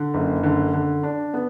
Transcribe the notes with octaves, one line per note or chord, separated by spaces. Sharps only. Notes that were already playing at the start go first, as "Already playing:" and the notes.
Already playing: D3
F#1
D3
D3
D4
B3